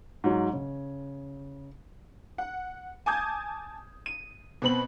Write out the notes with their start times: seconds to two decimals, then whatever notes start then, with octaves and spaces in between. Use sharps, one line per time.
0.24 G#2 F#3
0.53 C#3
2.38 F#5
3.06 G#5 A5 D6 D#6 G6 G#6
4.06 D#7
4.62 B2 B3 C4 B5 F#7